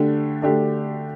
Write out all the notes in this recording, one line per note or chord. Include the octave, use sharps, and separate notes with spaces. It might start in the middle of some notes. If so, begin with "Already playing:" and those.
Already playing: D3 A3 D4 G4
D3 A3 D4 G4